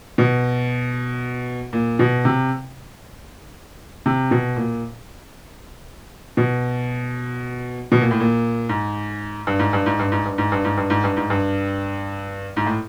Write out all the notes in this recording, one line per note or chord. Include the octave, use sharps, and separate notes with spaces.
B2
A#2
B2
C3
C3
B2
A#2
B2
B2
A#2
A2
A#2
G#2
G2
G#2
G2
G#2
G2
G#2
G2
G#2
G2
G#2
G2
G#2
G2
G#2
G2
G#2
A2